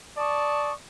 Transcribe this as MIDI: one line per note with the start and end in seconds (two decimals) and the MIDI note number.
0.17 0.74 74
0.17 0.73 81
0.17 0.73 85
0.17 0.73 87